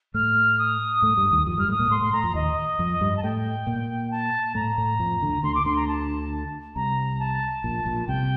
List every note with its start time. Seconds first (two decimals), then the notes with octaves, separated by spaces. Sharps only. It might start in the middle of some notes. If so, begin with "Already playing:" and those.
0.14 A2 A3 F6
0.59 D#6
1.02 A2 A3
1.17 G2 G3
1.32 D#2 D#3
1.47 F2 F3 D#6
1.57 G2 G3 F6
1.68 A2 A3 D#6
1.79 A#2 A#3
1.90 A2 A3 C6
2.01 A2 A3 C6
2.13 A2 A3 A#5
2.24 F2 F3
2.34 D#2 D#3 D#5
2.79 F2 F3
3.01 G2 G3
3.17 A5
3.23 A2 A3 G5
3.67 A#2 A#3
4.11 A5
4.55 A2 A3 A#5
4.78 A2 A3
4.99 F2 F3
5.22 D2 D3
5.43 D2 D3 C6
5.55 D6
5.65 D2 D3 C6
5.76 A#5
5.88 A5
6.76 C2 C3 A#5
7.19 A5
7.64 A#1 A#2
7.85 A#1 A#2
8.08 C2 C3 G5